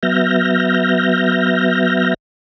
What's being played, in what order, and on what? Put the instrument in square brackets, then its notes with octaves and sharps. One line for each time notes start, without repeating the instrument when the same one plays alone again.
[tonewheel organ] F#3 B3 E5 F6 G6 A#6